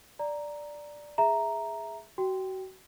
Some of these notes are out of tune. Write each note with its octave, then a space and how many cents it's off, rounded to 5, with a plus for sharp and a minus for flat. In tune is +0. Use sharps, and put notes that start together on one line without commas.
D5 +0 A#5 +0
G#4 +0 E5 +0 A#5 +0
F#4 +30 G5 +0